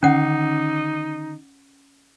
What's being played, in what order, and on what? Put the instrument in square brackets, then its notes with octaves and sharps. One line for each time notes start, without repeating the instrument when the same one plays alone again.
[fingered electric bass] D3 D#3 [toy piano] C#4 F#5 [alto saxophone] D#4